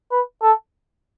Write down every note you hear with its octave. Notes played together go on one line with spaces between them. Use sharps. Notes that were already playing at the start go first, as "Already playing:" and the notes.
B4
A4